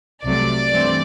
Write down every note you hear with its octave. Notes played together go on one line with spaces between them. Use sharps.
C2 C3 F#3 A3 D5
G2 E3 A3 C4